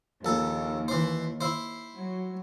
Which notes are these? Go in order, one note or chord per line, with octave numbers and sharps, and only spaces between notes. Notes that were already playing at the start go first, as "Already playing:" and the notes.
A#1 D#2 A4
E3 C5
E4 C5
F#3